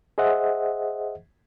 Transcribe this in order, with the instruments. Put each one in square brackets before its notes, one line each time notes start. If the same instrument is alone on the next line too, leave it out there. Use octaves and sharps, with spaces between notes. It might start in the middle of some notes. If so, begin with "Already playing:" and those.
[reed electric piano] G#4 C5 D#5 E5 F#5